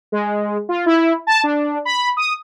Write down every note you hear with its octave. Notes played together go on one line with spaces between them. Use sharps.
G#3
F4
E4
A5
D4
B5
D#6